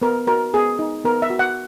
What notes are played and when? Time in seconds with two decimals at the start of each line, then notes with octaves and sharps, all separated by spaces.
0.02 B3 A#4
0.27 F#4 A#4
0.54 B3 G#4
0.79 D#4
1.04 B3 A#4
1.22 E5
1.30 F#4
1.39 F#5